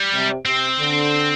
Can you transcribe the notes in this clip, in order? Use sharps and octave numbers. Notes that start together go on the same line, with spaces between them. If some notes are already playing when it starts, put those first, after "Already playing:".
Already playing: G3
C3
C3 C4
D3